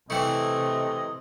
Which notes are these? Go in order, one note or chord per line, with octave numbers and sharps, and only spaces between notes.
C3 E3 A3 C4 E4 D#5